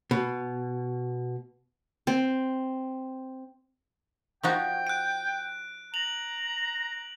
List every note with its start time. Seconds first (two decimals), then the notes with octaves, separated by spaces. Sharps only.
0.11 B2
2.07 C4
4.43 F3 D#4 F#4 G5
4.87 F#6 D7
5.94 A#5 F7 F#7